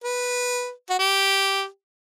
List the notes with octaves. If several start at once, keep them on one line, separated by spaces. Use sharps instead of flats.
B4
F#4
G4